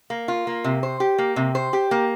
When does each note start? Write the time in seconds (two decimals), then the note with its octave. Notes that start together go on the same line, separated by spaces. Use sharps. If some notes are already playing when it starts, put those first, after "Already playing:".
0.10 A#3
0.28 F4
0.47 A#3
0.64 C3
0.83 C5
1.00 G4
1.18 A#3
1.36 C3
1.55 C5
1.73 G4
1.91 A#3